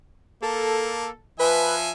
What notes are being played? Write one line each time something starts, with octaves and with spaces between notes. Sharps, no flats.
A#3 A4
F3 B4 E5 G#5